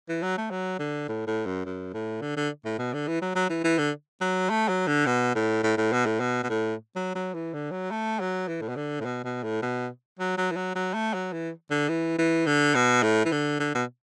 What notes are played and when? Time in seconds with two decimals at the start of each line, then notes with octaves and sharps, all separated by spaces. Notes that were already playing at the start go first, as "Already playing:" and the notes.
0.09 E3
0.22 F#3
0.37 A3
0.50 F#3
0.79 D3
1.08 A2
1.27 A2
1.46 F#2
1.65 F#2
1.94 A2
2.21 D3
2.37 D3
2.65 A2
2.78 B2
2.93 D3
3.07 E3
3.21 F#3
3.35 F#3
3.50 E3
3.64 E3
3.78 D3
4.21 F#3
4.50 A3
4.68 F#3
4.87 D3
5.06 B2
5.35 A2
5.63 A2
5.78 A2
5.92 B2
6.06 A2
6.20 B2
6.43 B2
6.49 A2
6.96 F#3
7.15 F#3
7.34 E3
7.54 D3
7.71 F#3
7.91 A3
8.20 F#3
8.48 E3
8.61 A2
8.69 B2
8.76 D3
9.00 A2
9.05 B2
9.24 B2
9.43 A2
9.62 B2
10.19 F#3
10.37 F#3
10.51 E3
10.56 F#3
10.75 F#3
10.94 A3
11.14 F#3
11.32 E3
11.70 D3
11.89 E3
12.18 E3
12.46 D3
12.74 B2
13.03 A2
13.25 E3
13.32 D3
13.60 D3
13.75 B2